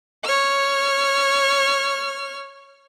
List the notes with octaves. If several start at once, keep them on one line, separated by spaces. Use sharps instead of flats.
C#5 F6